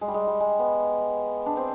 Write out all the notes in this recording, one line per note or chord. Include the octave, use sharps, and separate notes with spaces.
G#3
G3
G#3
G3
G#3
B3
D4
C4